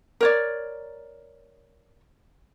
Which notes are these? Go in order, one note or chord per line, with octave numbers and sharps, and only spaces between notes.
A#4 C#5 D5